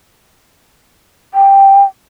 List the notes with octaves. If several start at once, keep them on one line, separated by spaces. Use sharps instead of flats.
G5